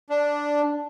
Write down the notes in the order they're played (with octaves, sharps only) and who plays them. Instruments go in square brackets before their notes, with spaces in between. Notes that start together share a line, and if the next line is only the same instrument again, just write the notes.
[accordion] D4